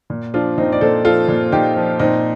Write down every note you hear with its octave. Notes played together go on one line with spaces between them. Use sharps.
A#2
F3 D4 F4
A#2 C4 D#4
D5
A#2 A4 C5
F3 F4 A4
A#2
A#2 D#4 G4
F3
A#2 C4 D#4